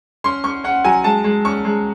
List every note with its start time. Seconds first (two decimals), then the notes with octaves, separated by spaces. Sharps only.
0.24 C#4 C6
0.44 C#4 C#6
0.64 C#4 F#5
0.84 F#3 G#5
1.04 G#3 A5
1.24 G#3
1.45 C#4 C#6
1.65 G#3